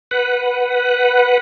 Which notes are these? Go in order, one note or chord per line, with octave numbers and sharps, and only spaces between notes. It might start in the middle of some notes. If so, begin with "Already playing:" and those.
B4 F#5